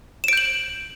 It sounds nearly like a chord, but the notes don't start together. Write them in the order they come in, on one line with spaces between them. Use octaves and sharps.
E7 D7 G6 F#7